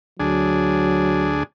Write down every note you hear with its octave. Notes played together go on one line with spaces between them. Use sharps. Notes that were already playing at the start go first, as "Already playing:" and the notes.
D2 F#3 D4 G#4